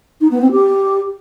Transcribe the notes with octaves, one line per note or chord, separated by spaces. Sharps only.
D#4
B3
C4
G4